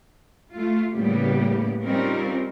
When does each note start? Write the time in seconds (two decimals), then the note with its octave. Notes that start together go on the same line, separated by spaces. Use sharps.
0.54 A3 F4
0.94 A2 C#3 G3 A#3 B3 G4
1.84 G3 C4 C#4 D#4 F4 A#4